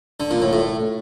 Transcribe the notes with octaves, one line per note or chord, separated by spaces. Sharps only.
D3
A#2
A2
A2